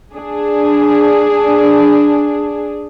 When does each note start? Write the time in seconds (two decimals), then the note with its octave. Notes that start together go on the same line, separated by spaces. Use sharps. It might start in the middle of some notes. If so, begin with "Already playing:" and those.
0.13 D4 G#4